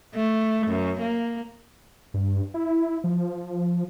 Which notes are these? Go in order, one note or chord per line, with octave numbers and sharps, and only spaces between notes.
A3
F#2
A#3
G2
E4
F3